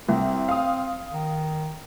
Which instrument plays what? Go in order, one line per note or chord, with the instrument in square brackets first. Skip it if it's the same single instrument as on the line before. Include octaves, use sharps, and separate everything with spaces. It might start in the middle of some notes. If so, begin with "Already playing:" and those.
[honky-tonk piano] C2 [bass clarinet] C4
[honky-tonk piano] F5 D#6
[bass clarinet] D#3